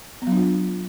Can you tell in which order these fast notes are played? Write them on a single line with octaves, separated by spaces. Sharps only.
B3 F#3 D4 F4